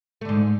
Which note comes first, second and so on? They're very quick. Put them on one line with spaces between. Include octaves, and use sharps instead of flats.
A3 D3 G#2